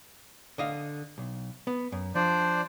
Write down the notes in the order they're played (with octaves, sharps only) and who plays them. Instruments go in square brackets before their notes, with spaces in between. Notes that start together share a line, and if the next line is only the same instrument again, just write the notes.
[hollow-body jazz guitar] D3 D#5 F5
B1
B3
F#2
[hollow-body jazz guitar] F3 [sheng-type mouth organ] D4 C5 D5